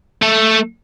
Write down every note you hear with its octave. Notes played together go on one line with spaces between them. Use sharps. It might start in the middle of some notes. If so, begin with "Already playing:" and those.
A3 A4